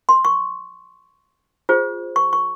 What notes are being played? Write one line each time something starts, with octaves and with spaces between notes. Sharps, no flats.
C6
C#6
F4 G#4 C5
C#6
C#6